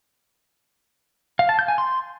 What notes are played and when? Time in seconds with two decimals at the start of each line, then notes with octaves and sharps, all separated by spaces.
1.39 F5
1.49 A5
1.59 G6
1.68 G#5
1.78 C6